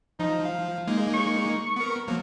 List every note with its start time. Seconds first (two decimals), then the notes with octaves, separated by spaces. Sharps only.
0.19 F3 D#4
0.45 F5
0.87 G#3 A#3 D#4
1.14 C#6
1.76 B3 A#4
2.08 F3 F#3 A#3